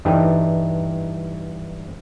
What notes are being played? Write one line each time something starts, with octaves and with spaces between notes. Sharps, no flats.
G2 E3 G3 D#4 A4 G5